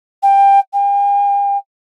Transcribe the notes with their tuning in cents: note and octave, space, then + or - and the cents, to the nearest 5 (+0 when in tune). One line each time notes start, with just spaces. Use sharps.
G5 +15
G5 +45